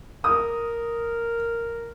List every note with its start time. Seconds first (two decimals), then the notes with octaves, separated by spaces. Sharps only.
0.24 A#4 D#6